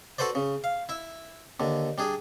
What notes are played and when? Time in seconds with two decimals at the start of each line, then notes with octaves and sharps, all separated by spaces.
0.18 F#4 A4 B4 C5 D5
0.35 C#3
0.64 F5
0.89 E4 E5
1.60 D#2 D3
1.98 G3 D4 G#4